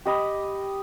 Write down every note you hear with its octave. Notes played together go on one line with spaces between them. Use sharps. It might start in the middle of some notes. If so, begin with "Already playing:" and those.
G4 D#5 B5